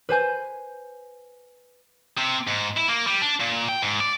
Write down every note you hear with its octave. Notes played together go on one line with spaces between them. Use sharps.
B4 C5 G#5 G6
C3
G#2
E4
A#3
G3
D4
A#2
G5
G#2
D5